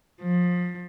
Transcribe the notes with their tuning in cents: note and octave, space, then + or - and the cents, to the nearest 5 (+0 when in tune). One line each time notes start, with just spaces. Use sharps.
F3 +25